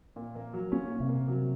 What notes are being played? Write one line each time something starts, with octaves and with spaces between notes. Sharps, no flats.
A#2
A#3
F#3
A#3 C#4
A#2
C3
A#3
F#3